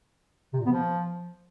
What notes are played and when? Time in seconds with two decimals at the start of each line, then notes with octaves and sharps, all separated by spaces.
0.54 C3
0.60 A#2
0.66 B3
0.72 F3